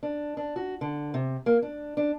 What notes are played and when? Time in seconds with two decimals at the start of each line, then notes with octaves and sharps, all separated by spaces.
0.03 D4
0.37 D4
0.56 F#4
0.81 D3
1.14 C3
1.46 A#3
1.62 D4
1.97 D4